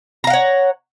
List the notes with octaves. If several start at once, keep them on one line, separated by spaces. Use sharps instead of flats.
C#5 F5 F#5 A#5